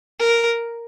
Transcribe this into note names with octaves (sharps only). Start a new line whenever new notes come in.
A#4